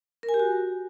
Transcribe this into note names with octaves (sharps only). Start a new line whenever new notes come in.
A#4
G#5
G4
F#4